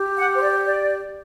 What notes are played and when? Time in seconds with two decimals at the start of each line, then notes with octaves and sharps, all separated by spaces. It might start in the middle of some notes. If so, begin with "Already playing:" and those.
Already playing: G4
0.17 F#5
0.35 C5
0.41 D5
0.65 D5